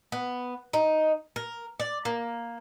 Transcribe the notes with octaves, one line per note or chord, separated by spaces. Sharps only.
B3
D#4
A#4
D5
A#3